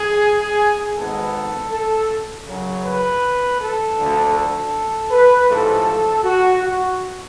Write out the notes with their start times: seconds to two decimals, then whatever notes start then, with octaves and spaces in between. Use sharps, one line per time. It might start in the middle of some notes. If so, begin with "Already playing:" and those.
Already playing: G#4
0.97 G#1 G#2 G#3 B3 A4
1.72 A4
2.47 F#2 C#3 F#3
2.85 B4
3.60 A4
3.98 D2 D3 F3 A3
4.36 A4
5.11 B4
5.48 A1 G#2 F3 A3 A4
6.23 F#4
6.62 F#4